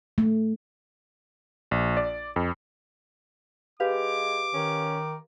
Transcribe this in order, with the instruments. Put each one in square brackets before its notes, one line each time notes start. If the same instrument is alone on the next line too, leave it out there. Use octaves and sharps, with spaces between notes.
[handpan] A3
[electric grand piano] A#1
D5
F2
[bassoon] G#3 [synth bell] G4 B4 F5 [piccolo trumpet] D6
[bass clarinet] D#3 [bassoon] C#4